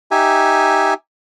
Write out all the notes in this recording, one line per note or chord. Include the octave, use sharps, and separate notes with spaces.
D#4 G4 E5 G#5